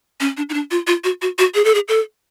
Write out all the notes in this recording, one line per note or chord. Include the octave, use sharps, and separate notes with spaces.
C#4
D4
D#4
D4
F4
F4
F#4
F#4
F#4
G#4
A4
G#4
A4